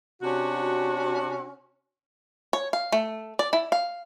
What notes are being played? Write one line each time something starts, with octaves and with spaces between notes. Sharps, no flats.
C3 C#4 D4 F#4
C#5
F5
A3
D5
E4
F5